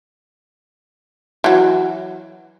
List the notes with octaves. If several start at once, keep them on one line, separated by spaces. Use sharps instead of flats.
E3 F#3